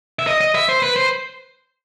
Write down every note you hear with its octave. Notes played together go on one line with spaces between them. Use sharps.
E5
D#5
D#5
E5
C5
B4
C5